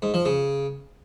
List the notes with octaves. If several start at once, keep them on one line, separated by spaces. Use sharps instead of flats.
G#2
F3
C#3